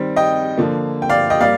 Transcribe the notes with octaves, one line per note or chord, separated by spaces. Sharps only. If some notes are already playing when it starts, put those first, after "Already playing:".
Already playing: D#3 G3 C4
D#5 G5
D3 F3 A#3
G5
D5 F5
D#5 G5
G3 A#3 D5 F5